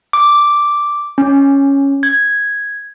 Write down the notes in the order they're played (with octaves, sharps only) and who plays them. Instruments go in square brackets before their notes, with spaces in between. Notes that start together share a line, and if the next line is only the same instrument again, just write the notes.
[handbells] D6
C#4
G#6